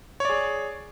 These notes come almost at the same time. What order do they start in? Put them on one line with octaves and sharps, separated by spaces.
C#5 D5 G#4